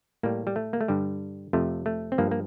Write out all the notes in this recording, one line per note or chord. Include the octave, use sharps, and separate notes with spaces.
A2 G3 A#3
G3
A3
A#3
A3
G2 D3 G3
F2 C3 F3 A3
A3
C4
G2 F3 A#3
A#3